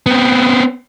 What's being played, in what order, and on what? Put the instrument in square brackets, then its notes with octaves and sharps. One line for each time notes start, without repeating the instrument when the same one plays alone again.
[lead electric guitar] B3 C4